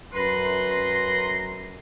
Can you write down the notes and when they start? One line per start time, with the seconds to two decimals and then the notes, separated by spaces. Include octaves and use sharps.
0.13 F#2 B4 A#5 C6